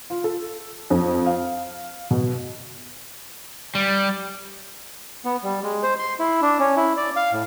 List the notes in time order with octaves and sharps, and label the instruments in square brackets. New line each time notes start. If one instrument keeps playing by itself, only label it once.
[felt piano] F4
A4
F2
F5
B2
[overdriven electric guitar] G3
[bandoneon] B3
G3
G#3
C5
C6
E4
D4
C#4
E4
D5
F5
A2